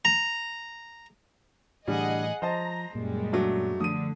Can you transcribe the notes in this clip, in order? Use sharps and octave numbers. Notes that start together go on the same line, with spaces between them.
A#5
A2 D3 E3 G3 G#4 D#5 F#5
F3 C5 D#5 A5 A#5
F#2 A#2 G3 G#3
F#3 A3 D4
D3 F3 A3 D4 D#6 D#7